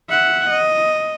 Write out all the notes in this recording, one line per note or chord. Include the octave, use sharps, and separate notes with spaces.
E5 F#5
D#5